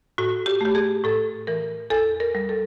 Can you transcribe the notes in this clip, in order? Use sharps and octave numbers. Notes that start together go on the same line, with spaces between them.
A2 F#4
G4
A3 G4
G#4
A2 A4
E3 A#4
E2 A4
A#4
G3
A4